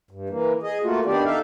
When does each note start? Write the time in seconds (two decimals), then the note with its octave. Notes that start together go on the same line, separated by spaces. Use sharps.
0.11 G2
0.30 E3 A#3
0.63 G#4 D#5
0.83 A3 A#3 F4 F#4
1.05 D#3 B3 D4 G4 D5
1.25 D#4 A4 E5 F5